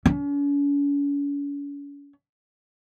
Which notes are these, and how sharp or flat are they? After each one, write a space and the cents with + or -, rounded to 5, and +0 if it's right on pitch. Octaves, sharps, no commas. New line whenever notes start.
C#4 +45